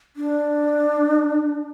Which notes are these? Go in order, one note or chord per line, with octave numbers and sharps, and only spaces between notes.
D4